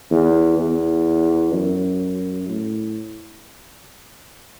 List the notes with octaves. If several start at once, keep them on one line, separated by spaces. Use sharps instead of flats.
E2
E2
F#2
A2